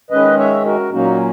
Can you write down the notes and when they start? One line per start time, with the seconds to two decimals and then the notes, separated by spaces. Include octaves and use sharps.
0.10 D#3 G#3 C#4 B4 D#5
0.38 C#5 E5
0.65 F#4 A#4
0.93 A#2 F#3 A#3 C#4 D#4 F#4